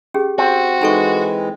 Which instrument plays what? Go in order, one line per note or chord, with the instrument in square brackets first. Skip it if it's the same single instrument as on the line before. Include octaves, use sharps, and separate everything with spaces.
[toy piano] C#4 G4 G#4
[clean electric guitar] C4 [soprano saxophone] F#4
[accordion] E3 G#3 [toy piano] D#4 A4 C#6